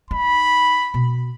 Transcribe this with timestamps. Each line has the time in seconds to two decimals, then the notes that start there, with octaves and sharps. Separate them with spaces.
0.11 D#4 B5
0.94 B2